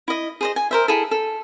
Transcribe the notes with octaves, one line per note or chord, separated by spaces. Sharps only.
E4 D#5
G#4 C5 D#5
G#5
A#4 C5 E5
E4 G#4 A4
A4